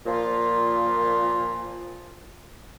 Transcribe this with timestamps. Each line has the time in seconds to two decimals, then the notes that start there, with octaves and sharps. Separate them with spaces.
0.06 A#2 F3 F4